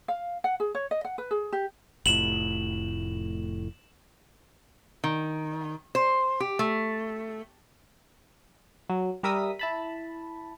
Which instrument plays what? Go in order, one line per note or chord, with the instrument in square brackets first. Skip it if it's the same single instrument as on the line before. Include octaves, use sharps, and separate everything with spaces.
[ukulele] F5
F#5
G#4
C#5
D#5
F#5
B4
G#4
G4
[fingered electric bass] F1 A2 [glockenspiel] E7 F#7
[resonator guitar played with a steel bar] D#3
C5
G4
A3
[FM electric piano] F#3
G3 A#4 E5 D#6 B6
E4 A5 B5